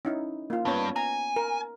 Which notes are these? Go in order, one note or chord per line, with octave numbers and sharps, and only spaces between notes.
C#4 D#4 E4
A#3 F4
G2 B3 C#4 C#5
G#5 A#5
A#4